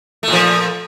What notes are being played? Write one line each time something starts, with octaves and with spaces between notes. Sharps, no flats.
A#2 F3 A3